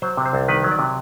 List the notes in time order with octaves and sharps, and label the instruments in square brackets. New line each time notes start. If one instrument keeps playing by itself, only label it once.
[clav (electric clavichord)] F#3 C5
C3
C5
C2
D#3 B4
F#3
D5
C3